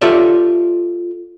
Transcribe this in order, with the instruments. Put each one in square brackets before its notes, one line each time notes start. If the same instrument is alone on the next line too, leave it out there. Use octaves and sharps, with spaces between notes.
[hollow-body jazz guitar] F4 G4 A4 C#5 D5 E5